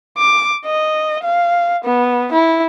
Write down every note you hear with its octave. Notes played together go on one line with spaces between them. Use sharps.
D6
D#5
F5
B3
E4